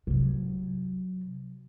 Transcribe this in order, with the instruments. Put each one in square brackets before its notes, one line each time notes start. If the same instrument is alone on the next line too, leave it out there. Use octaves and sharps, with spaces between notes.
[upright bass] C3 F#3